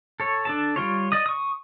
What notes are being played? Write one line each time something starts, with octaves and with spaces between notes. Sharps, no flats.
A4 C#5
D4 A4 A5
G3 F4 C#5
D5 D#5 D#6
C#6 D#6